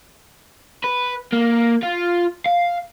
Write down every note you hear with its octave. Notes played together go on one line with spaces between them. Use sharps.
B4
A#3
F4
F5